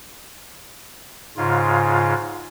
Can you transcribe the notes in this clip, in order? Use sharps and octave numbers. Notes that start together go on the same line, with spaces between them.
G#2 C#3 F4